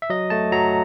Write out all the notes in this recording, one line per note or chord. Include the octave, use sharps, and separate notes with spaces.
E5
F#3 D#5
A3 A5
F#3 A#5